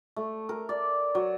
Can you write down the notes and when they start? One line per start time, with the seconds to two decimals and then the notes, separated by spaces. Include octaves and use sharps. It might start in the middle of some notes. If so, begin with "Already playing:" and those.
0.16 A3
0.49 A#4
0.69 D5
1.15 F#3